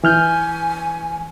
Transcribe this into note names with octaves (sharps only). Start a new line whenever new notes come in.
E3 G#5 F6 G6